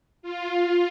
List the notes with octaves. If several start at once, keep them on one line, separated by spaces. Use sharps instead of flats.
F4